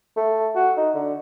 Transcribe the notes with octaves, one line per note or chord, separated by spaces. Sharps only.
A3
F#4
D#4
D3